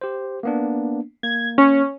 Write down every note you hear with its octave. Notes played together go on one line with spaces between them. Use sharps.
G4 C5
A#3 B3 D4
A#3 G#6
C#4